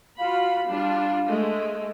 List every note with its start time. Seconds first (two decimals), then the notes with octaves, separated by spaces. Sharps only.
0.19 F4 F#4 F5 B5
0.69 G3 D4 F4
1.29 G#3 A3